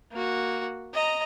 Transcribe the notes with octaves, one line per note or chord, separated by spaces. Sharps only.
A#3 F#4
D#5 A#5